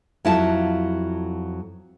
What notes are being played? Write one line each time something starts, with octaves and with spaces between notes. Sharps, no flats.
F2 F#3 E4 F4 A5